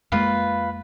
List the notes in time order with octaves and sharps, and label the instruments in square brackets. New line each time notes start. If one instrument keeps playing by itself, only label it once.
[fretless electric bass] F2 G#3 A#3 [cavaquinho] F4 B4 F5